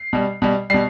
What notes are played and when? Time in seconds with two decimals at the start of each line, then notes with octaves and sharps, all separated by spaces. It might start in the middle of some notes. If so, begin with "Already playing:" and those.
Already playing: C7
0.13 B2 G3
0.42 B2 G3
0.70 B2 G3 C7